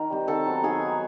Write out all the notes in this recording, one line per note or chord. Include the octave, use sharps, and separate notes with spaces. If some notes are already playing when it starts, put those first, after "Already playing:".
Already playing: D#3 A#4
G3 C4
D#3 A4 A5
F#3 B3
D#3 G#4 G#5
F#3 B3